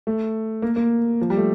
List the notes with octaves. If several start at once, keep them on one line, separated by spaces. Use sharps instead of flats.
A3
A#3
A#3
F3
G3
A3